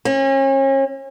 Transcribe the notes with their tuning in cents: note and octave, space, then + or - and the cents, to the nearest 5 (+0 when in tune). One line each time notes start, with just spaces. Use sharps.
C#4 -35